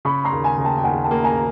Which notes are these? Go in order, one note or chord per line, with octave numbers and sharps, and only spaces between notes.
C#3 B5 C#6
A#5 C6
D#2
G#5 A#5
C#3 A#5
G5 A5
G5
D#2 F#5 G#5
G5 A5
A#3
G#5 A#5